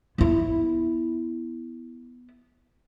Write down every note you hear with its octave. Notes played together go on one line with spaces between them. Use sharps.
B3 E4